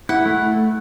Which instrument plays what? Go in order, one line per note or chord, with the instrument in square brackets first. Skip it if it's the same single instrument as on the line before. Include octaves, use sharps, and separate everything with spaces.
[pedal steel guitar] E4 [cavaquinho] F#5
[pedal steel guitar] A3